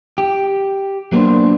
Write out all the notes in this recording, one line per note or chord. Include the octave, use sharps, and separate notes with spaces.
G4
F#3 A#3 B3 D4 C5